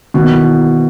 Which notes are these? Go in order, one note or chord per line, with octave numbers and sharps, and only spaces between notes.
B2 D#3
E3